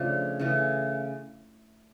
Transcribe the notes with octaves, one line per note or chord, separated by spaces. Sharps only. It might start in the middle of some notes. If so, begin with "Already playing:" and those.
Already playing: C#3 F3 A3 D4
C#3 E3 A3